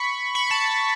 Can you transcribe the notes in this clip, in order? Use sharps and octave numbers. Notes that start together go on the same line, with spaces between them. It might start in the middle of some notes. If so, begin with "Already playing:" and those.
Already playing: B5 C#6
B5 C#6
A5 B5